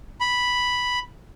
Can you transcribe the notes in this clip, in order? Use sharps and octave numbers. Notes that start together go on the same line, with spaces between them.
B5